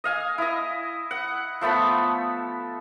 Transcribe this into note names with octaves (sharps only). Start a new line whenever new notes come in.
D#5 F5 G#5
E4 D#5
F#5
F3 A3 B3 B5